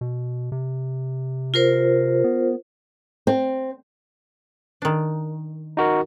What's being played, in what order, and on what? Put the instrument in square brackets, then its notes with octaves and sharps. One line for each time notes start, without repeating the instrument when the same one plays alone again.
[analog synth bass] B2
C3
[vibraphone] F4 A#4 C5
[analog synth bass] B3
[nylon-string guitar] C4
[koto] D#3 D4
[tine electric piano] D#4 F#4 A#4